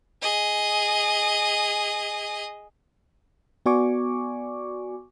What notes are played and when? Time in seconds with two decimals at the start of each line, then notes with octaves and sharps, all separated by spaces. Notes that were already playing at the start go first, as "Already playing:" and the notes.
0.22 G#4 D#5
3.66 B3 F#4 D5 G#5 C#6 D6